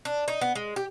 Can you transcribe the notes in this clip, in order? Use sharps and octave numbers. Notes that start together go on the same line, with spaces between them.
D4
D#4
B3
G#3
G4